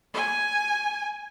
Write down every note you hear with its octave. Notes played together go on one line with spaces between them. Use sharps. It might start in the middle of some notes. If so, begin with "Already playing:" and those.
G#5